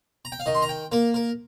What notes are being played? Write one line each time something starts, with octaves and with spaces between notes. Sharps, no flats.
A#5
G5
F5
D#3 D#5
C6
A#5
G5
A#3 A#4
A#4